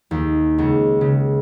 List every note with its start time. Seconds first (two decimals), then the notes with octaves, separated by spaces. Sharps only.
0.11 D#2
0.58 C#2
1.01 C#3